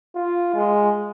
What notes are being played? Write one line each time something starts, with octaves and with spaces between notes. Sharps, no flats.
F4
G#3